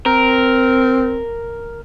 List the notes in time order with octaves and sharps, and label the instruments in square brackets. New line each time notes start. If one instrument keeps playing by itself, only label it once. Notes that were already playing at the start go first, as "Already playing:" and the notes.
[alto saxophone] C4 [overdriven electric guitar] A#4